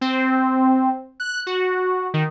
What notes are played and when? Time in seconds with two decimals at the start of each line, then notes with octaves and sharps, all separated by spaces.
0.01 C4
1.20 F#6
1.47 F#4
2.14 D#3